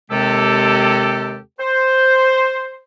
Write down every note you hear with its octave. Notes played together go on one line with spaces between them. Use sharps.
D#2 C3 G#3 C4 G4 A4
C5